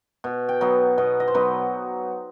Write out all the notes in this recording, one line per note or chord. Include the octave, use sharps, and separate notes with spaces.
B2
G5
F#3 B3 D#4
B2 D#5
D#5
C5
F#3 B3 D#4 B4